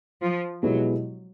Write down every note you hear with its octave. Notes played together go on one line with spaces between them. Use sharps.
F3
B2 F#3 G#3 B3 E4 G4